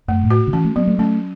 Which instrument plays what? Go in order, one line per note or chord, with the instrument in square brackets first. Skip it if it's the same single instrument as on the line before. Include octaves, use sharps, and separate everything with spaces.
[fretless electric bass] F#2 [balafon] A3
[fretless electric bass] A2
[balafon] F#4
[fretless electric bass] C#3
[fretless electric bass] E3 [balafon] C#4
[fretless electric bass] A3
[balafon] F#3 [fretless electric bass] B3
[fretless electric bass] A3
[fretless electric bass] A3 [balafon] C#4